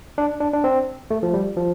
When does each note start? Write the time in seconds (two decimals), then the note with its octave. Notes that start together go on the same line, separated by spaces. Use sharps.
0.18 D4
0.40 D4
0.53 D4
0.64 C4
1.11 A3
1.23 F3
1.34 G3
1.57 F3